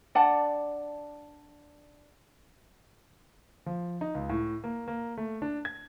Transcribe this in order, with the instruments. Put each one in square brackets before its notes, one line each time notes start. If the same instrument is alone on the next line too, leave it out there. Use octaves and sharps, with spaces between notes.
[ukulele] D4 D5 F#5 A5
[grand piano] F3
D#4
C#2
A2
A#3
A#3
A3
D4
G#6